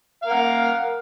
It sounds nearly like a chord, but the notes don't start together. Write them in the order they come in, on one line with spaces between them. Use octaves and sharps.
F5 A#4 F#5